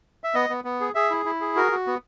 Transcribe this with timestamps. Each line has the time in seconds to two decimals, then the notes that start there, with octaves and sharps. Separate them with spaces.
0.24 E5
0.34 B3 D#5
0.49 B3
0.64 B3
0.80 G#4
0.95 G#4 E5
1.10 E4
1.25 E4
1.41 G#4
1.56 F#4 A#4
1.72 F#4
1.87 B3